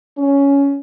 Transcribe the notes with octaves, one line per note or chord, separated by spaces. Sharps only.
C#4